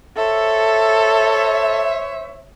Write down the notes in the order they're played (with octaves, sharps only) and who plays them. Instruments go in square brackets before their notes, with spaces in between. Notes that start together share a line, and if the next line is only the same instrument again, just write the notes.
[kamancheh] A4 [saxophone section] C5 C#5 E5